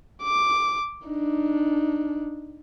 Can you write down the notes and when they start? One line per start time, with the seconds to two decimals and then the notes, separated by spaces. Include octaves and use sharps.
0.23 D6
1.08 D4 D#4